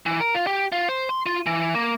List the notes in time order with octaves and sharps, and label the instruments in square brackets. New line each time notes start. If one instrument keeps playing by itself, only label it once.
[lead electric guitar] E3
A#4
F4
G4
F4
C5
C6
F4
E3
A#3